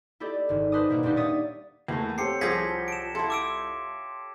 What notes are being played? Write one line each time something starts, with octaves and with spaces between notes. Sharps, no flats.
E4 G4 A4 D5 D#5
G#1 G#2
B4 C5 D#5 A5 D6 D#6
B2 G3 A#3 E4 A#4
D#1 A#2 G3 D4 D#4 G4
C#5 D5 E5 D#6 A6
E2 A3 A#3 A#5
C4 G4 A4 C#5 C7 C#7
C2 F3 G#4 G#6 A#6 B6
D7 E7
E4 F4 A4
D6 E6 D7